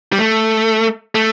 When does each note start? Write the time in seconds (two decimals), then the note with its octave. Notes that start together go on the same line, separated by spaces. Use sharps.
0.12 G3
0.19 A3
1.15 A3